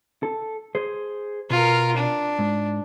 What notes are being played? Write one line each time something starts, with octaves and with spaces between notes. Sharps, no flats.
A4
G#4 C5
B2 F4 A#4
D4
G#2